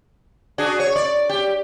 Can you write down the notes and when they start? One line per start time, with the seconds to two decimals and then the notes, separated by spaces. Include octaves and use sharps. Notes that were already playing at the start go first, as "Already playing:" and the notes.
0.58 D4 F#4 G#4
0.80 C#5
0.96 D5
1.29 G4